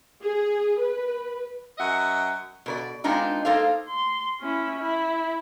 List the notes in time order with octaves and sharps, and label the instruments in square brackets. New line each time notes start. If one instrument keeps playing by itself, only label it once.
[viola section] G#4
B4
[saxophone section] F#2 D#5 E5 F#5
[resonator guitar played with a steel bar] B2 B4 D5
G#3 B3 C4 D4 D#4 F4
A#3 D#4 A4 C5 F5
[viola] C6
C#4 E4
E4